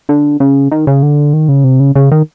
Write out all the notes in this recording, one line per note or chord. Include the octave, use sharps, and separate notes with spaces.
D3
C#3
D#3
C#3
D3
D#3
C#3
C3
C#3
C#3
D#3